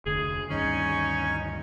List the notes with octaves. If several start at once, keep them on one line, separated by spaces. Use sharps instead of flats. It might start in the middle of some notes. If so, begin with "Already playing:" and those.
F1 D2 D3 G#4
D2 G2 D#3 C#4 D#4 G#5 C#6